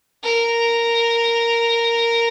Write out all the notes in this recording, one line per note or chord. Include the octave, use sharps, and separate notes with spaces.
A#4